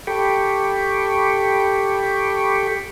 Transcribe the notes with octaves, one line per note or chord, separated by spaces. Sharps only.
G4 A4 G5 B5 C#6 D6